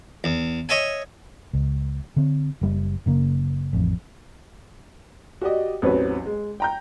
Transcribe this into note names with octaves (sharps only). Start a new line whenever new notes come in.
E2
C#5 D#5 E5 G#5
C#2
D3 C4
F#1 G3
F#1 C#3 A#3
A1 F2
F#4 G4 D5 D#5
A1 E2 F#3 C4 B4 C#5
G#3
G5 A#5 G6